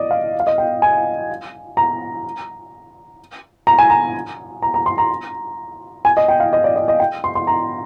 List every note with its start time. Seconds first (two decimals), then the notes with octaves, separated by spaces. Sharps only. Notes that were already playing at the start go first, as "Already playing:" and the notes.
Already playing: D5 D#5
0.11 F5
0.40 F5
0.47 D#5
0.58 G5
0.82 G#5
1.77 A#5
3.67 A#5
3.78 G#5
3.90 A#5
4.62 A#5
4.74 A#5
4.86 C6
4.98 A#5
6.05 G#5
6.17 D#5
6.28 G5
6.40 F5
6.53 D#5
6.64 D5
6.76 D#5
6.88 D#5
7.00 G5
7.24 C6
7.35 C6
7.47 A#5